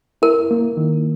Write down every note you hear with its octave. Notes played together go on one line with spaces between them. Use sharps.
E4 A#4
A#3
D#3